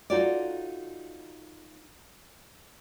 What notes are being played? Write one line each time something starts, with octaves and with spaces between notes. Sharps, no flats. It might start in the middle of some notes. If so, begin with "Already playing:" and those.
D#4 F4 F#4 A4 C#5 D5